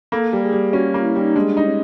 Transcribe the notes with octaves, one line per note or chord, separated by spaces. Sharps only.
A#3 A4
G3
G#4
G3
C#4 F#4
A#3 F4
E4
G3 D#4
G#3 D4
D#4
C#4